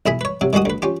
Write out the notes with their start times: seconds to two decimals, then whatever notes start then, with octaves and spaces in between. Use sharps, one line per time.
0.06 B1 E4 G#4 B5
0.21 B4 C#5
0.41 C3 F#3
0.53 D#3 G3 G#3 F#4 D#6
0.65 D2 B4
0.82 C#4 F4 G4